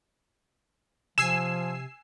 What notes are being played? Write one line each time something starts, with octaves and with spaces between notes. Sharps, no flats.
C3 F3 G#5 E6 C7 E7